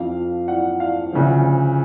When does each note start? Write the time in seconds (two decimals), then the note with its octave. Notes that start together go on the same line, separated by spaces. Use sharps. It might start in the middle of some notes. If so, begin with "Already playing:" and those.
Already playing: F2 F3 F5
0.48 F#5
0.80 F5
1.13 D2 C#3 F3